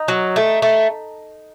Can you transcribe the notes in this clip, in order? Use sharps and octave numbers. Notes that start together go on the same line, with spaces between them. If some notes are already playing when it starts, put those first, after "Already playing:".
Already playing: D#4
F#3
A3
A3